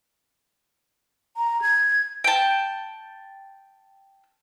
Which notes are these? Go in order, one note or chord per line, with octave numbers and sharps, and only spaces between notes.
A#5
G#6
G5 A5